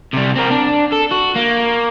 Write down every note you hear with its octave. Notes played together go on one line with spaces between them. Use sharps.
C3 G3
C4 A#4
D4
A4
F#4
A#3